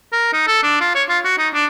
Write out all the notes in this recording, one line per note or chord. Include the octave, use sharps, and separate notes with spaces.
A#4
D#4
A4
D4
F4
C#5
F4
F#4
D#4
D4